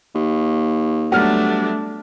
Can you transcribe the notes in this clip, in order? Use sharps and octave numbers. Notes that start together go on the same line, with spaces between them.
D#2
F#3 G3 A3 B3 D4 F#5 F6